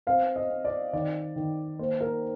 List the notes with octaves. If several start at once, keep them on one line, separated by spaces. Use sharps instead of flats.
C4 F5
D#5
C4
D5
D#3 D5
D#3
A#3 C5
A#4